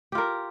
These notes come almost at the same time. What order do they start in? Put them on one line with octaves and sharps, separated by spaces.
G4 F4 A#4